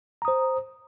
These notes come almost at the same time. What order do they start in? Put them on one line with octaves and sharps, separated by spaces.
A#5 D#6 C5